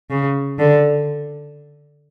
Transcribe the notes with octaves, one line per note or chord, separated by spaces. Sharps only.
C#3
D3